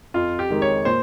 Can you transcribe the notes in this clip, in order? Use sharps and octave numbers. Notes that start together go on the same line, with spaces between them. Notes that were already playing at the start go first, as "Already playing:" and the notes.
F2 F4
G4
D#3 G#3 D#4
C#5
A#2 C5